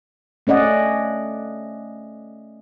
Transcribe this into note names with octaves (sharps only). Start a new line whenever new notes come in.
A3 C#4 D5 D#5 F#5